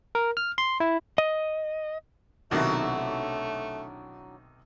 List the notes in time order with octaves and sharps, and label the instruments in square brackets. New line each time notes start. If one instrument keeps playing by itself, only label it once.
[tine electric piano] A#4
F6
C6
E4
[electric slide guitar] D#5
[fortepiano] B1 C3 D#3 [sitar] F#3 D4 E4 [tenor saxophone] A3